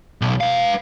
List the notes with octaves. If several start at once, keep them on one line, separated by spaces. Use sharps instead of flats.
B1
B4 F5